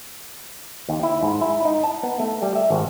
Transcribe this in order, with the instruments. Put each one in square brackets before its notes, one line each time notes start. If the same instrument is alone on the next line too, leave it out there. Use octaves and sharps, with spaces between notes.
[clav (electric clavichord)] D#2
E4
G#2
E4
D#4
A5
B3
A3
G3
E5
G#1